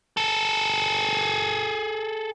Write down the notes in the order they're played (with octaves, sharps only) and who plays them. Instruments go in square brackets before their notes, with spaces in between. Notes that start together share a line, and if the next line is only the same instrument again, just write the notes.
[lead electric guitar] G#4 A4